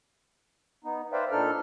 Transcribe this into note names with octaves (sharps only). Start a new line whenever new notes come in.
B3 D#4
B4 C5 D5 E5 F5 G5
A#2 D4 D#4 A4 F6